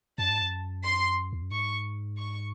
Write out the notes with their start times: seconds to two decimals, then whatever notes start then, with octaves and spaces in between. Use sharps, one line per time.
0.18 F#2 A5
0.30 G#2
0.42 F#2
0.84 C6
1.33 E2
1.42 F#2
1.51 G#2 C#6
2.18 C#6